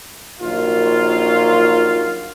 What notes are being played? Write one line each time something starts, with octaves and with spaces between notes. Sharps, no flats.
A#1 D#3 F#3 F4